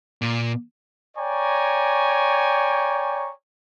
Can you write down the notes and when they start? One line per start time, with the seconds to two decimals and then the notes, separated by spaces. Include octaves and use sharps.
0.22 A#2
1.17 C#5 D5 G5 G#5 A#5 C#6